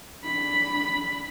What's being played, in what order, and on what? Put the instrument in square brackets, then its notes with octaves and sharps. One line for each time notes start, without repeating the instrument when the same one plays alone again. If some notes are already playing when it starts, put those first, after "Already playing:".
[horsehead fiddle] D4 B5